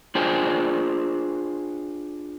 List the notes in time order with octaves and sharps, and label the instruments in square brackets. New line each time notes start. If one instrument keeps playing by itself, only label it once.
[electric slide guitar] D4 F4 G#4 C5 G5 G#5